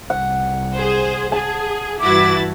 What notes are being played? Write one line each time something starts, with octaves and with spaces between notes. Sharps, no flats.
C2 F#5
G#4 C5
G#4 A5
G2 E3 E4 F#4 D6 A6